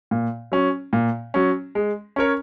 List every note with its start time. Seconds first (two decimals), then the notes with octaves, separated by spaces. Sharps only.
0.11 A#2
0.52 F#3 C#4
0.93 A#2
1.34 F#3 C#4
1.75 G#3
2.16 C#4 A#4 C#5